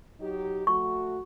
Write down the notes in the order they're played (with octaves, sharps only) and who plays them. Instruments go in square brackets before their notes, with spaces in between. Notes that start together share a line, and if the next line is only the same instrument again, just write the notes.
[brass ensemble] F#3 D#4 G4
[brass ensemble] A3 F#4 [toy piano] C#6